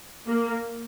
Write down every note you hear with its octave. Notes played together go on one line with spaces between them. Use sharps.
A#3